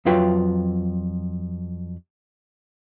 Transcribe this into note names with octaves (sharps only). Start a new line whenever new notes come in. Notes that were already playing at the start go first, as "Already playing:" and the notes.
F2 F#3 F4 B4 G5